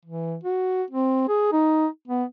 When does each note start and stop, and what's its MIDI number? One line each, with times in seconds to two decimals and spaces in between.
0.05 0.36 52
0.43 0.83 66
0.90 1.26 60
1.29 1.49 68
1.52 1.87 63
2.07 2.24 59